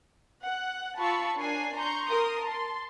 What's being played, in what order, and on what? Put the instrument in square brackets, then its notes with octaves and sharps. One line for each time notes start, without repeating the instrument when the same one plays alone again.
[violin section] F#5
F4 A5 B5 C#6 E6
D4 A#4 C#5 G#5 C7
A#5 C6 C#6 G6
A#4 C6 D#6
A5 C6